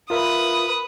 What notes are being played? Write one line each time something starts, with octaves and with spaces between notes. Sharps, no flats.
F4 A#4 B4 E5 D#6